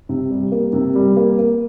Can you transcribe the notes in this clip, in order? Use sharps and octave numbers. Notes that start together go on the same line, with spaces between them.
C3
G3
A#3
C3
G3
A#3
A#3